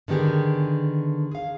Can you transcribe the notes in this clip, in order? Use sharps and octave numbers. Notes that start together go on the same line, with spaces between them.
D3 D#3 B3 G4 G#4
G#4 F5